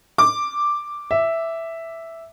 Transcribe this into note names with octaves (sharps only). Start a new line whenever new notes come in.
D6
E5